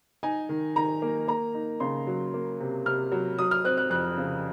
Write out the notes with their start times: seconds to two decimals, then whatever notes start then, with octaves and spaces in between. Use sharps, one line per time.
0.23 D#4 G#5
0.49 D#3
0.76 D#3 A#5
1.02 A#3
1.28 A#3 A#5
1.54 D#4
1.80 C#3 C6
2.07 F#3
2.34 A#3
2.60 C3
2.86 C3 F6
3.12 F#3
3.39 F#3 D#6
3.51 F6
3.65 C4 F#6
3.78 F#6
3.90 F2 F#6
4.18 C#3